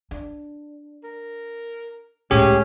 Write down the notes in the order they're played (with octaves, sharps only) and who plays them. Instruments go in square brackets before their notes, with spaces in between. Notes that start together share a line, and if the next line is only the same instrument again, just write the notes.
[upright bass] D4
[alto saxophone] A#4
[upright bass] C#2 A2 [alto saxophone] C#4 [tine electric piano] G4 G#4